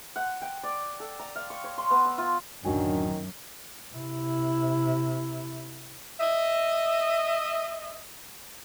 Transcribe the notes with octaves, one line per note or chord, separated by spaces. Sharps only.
F#5
G5
D5
A4
A#5
F5
C#6
C#5
C6
B3
E6
F4
D1 F#2 D#3 F#3 D4 G#5
C3 E4
D#5 E5